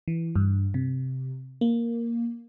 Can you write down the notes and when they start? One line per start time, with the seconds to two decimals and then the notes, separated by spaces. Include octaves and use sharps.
0.08 E3
0.36 G2
0.74 C3
1.61 A#3